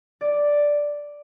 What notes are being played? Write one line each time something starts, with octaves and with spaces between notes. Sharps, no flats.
D5